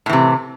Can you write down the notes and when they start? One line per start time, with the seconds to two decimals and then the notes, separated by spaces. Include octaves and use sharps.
0.06 A2
0.09 E3
0.13 C3